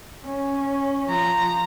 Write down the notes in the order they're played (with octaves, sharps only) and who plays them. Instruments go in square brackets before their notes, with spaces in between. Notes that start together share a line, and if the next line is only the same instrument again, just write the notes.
[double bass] C#4
[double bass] F3 [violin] A#5